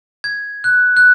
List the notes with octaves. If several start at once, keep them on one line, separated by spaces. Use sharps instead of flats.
G#6
F#6
F#6